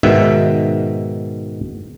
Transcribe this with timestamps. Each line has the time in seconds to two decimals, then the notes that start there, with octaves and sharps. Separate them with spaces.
0.03 G#2 B2 D#3 E5